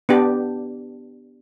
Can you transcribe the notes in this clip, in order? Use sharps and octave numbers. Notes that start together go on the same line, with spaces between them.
B3 D4 G4